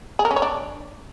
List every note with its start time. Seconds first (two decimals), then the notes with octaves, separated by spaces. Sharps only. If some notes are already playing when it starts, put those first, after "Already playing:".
0.19 G#4
0.25 A#4
0.31 C#4
0.36 C#5
0.42 D4